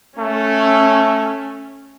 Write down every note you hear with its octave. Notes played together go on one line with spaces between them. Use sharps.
A3 C#4